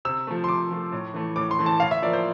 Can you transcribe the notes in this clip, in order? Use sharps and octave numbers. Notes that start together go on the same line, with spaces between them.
C3 E6
F3 A3
C6
C3 D6
F3 A3
A2
E3 A3
A2 D6
C6
E3 A3
A5
A2 F5
E5
F3 A#3 D5
C5